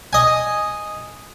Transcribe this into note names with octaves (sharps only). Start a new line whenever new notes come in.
D#5 G#5